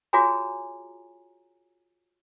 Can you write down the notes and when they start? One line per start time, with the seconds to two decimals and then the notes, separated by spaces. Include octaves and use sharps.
0.13 F4 F#4 G#4 C#5 G#5 A#5